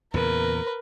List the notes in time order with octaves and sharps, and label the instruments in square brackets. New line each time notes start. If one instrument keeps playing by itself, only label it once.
[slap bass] E2 A#2 C#3 [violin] A#4 [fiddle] B4